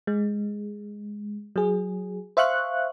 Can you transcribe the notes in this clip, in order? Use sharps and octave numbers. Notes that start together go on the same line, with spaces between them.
G#3
F#3 G#4
C5 E5 F5 C#6 F#6